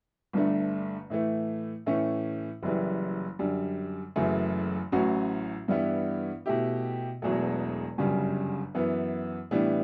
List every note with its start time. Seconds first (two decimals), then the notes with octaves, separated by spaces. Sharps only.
0.33 G1 G2 D3 A3
1.10 A2 E3 A3
1.86 A2 E3 A3 C#4
2.63 F#1 F#2 E3 G3
3.39 F#2 D3 G3
4.16 F#1 F#2 C#3 E3 A3
4.92 A1 A2 F#3 C#4 F#4
5.68 G2 E3 G3 B3 E4
6.46 B2 A3 E4 G4
7.22 E1 E2 B2 F#3 A3
7.98 G1 F#2 C#3 G3
8.75 F#2 E3 B3
9.51 A2 E3 G3 B3 D4